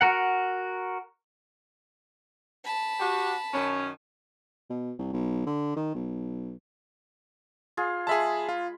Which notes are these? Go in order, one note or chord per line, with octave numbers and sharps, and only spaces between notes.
F#4 A#4 F#5
A5 B5
F#4 G4
F#2 D#3 C#4
B2
C2
B1
D3
D#3
B1
F4 G#4
G#3 G#4 E5 A5 B5
F4